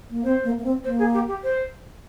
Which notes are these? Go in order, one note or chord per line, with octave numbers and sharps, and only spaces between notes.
A#3
C4 C5
A#3
A#3
C4
A#3 C5
G#4
G4
G4
C5